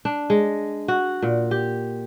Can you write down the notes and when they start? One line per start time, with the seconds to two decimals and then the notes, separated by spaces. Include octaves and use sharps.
0.05 D4
0.30 G#3
0.88 F#4
1.22 A#2
1.51 G4